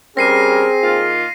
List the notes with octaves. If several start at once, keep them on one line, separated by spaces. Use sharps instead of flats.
G3 C4 C#4 G#4 A#4 A#6 C7 D#7
D#3 A#3 F4